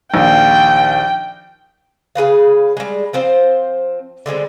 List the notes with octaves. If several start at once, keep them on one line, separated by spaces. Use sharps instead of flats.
A#1 D#2 G5
C#3 G#4 B4 F5
G3 G#3
F3 C4 C5
D3 G3 G#3 C4